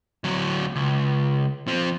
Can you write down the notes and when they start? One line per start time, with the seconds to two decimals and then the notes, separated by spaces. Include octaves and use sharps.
0.24 D2 F#3
0.76 C#2
1.68 F3 C4